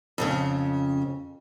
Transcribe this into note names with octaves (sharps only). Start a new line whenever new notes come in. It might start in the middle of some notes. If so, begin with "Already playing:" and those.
F2 A#2 C#3